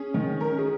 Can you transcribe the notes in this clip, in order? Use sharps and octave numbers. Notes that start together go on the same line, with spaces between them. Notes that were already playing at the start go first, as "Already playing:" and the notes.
Already playing: C#4 G#4
D#3
C#4 A#4
G#4